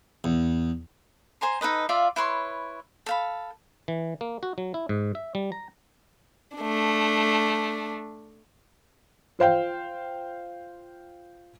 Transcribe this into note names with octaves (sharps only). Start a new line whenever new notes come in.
E2
C5 G#5 A#5 C6
D#4 A4 B4 D#5
F4 D5 E5 F5
E4 B4 C#5 C6
A4 F5 B5
E3
A#3
F#4
F#3
E4
G#2
E5
G3
A#5
A3 D4
F4 C5 F5 G5